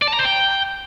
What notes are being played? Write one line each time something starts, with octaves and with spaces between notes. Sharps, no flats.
D5
A5
A#5
C5
G5